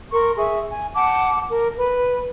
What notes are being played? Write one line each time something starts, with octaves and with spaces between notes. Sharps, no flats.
A#4 C6 C#6
G#4 E5 C#6
G#5
F#5 A5 D6
A#4
B4